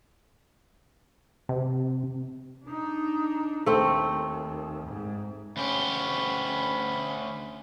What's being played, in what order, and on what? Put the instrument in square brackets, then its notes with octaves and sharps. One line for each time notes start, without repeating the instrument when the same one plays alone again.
[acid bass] C3
[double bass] D4 D#4
[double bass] D#2 [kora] A3 C4
[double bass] G#2
[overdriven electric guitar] D2 G4 [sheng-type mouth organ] C#4 B5